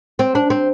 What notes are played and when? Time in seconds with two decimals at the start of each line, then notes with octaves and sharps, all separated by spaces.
0.19 C4
0.35 D4
0.50 C4